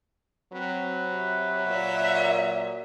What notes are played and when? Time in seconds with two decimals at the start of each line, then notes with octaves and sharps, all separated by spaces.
0.53 F#3 C4 B4
1.12 C3
1.67 A#2 E5